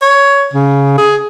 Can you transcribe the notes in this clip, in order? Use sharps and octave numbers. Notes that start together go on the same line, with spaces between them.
C#5
C#3
G#4